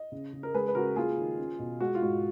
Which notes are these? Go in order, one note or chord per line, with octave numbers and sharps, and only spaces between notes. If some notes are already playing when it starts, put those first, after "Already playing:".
Already playing: D#5
C#3
C#3
A#4
G#3 G#4 B4
B4
C#3 F#4 A#4
A#3 F4 G#4
D#3
C#4
B2
G#3 F#4
F4
G#2 F#4